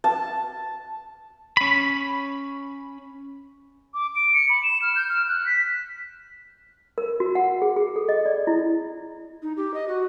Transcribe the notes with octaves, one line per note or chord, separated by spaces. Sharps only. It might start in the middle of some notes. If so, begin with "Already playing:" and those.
A5
C#4 B5
D6
D7
C#7
B5
E7
F6
G6
F6
F#6
B6
A#4
F#4
F#5
G#4
G#4
A4
D#5
D5
E4
D#4
G4
D#5
F#4